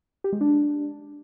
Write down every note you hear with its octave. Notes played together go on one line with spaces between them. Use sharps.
G4
G#3
D4